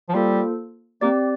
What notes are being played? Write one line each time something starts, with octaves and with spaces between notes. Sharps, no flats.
F3
G3 A#3 F4 A4 C5
A#3 C4 G4 D5